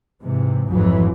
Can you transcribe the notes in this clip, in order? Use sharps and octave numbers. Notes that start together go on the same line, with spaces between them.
G#2 C3 E3
A1 F2 G#2 E3 F#3